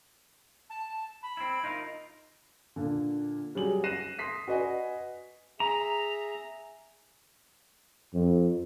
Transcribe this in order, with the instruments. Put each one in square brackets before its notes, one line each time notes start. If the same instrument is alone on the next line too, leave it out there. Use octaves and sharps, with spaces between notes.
[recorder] A5
B5
[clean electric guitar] C4 E4
D#4 F4 A#4
[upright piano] A#2 D3
F#3 G3 G#4 F#7
F#6 A#6 C7 D#7 E7
C6 D#6 B6 C7
F#4 B4 D5 D#5 G#5
[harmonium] G#4 E5 [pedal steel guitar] A#5
[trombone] F2